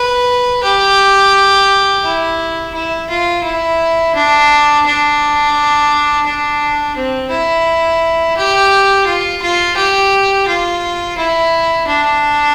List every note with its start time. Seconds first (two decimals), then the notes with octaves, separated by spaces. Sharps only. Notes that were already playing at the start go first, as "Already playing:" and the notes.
Already playing: B4
0.63 G4
2.04 E4
2.74 E4
3.09 F4
3.44 E4
4.15 D4
4.85 D4
6.26 D4
6.96 C4
7.30 E4
8.37 G4
9.06 F4
9.42 F4
9.76 G4
10.47 F4
11.17 E4
11.87 D4